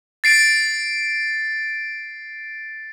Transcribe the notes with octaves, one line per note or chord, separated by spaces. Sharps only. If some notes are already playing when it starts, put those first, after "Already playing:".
A6 C7 D7